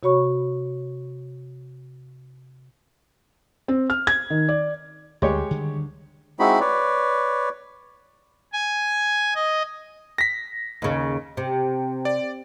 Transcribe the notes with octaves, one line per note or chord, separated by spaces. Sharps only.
C3 F#4 C#5 B5 C#6
C4
F6
G#6
D#3
D5
D2 G3 G#3 G4 C#5
D3 D#3 G3
G#3 C4 D#4 E4 F#4 B5
B4 C#5 D5
G#5
D#5
A#6 B6
D#2 C#3
C3
D5